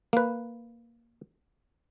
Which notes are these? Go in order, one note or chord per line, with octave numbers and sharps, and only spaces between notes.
A#3 B4